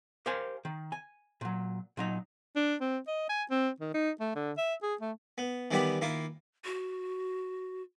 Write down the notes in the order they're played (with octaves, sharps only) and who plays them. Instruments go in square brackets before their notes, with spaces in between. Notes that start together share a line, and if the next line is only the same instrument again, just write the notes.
[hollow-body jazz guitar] G4 A#4 C5 F5 G#5
D#3
G#5
A#2 F#3
A#2 F#3 D#4
[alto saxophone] D4
C4
D#5
G#5
C4
D#3
D#4
A3
D3
E5
G#4
A3
[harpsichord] B3
D#3 E3 G3 B3 G4 B4
D#3 A#3 E4 F4
[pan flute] F#4